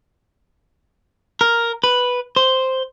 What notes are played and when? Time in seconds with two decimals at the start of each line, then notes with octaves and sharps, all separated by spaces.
1.41 A#4
1.84 B4
2.36 C5